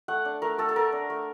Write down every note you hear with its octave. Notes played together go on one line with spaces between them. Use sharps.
A3 F#5
D4
A3 A#4
A3 A4
A4
A3 A#4
D4
A3